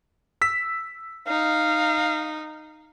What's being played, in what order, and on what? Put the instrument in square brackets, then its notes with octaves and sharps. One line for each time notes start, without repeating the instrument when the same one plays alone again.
[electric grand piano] E6 B6
[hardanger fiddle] D#4 [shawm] F5